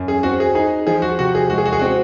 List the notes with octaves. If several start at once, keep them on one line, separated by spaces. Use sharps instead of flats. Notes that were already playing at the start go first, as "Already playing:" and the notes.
Already playing: F#2
G#4
C4 F#4
G#4
D#4 G#4
F3 G#4
F#4
C3 F#4
G#4
G#3 F#4
G#4
F#4
G#4
C4 F#4